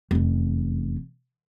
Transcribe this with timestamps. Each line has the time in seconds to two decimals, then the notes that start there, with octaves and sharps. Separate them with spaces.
0.11 F1 E2